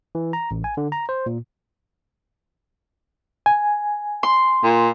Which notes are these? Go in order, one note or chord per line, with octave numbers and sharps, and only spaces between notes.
E3
A#5
A1
G#5
D3
A#5
C5
A#2
G#5
C6
A#2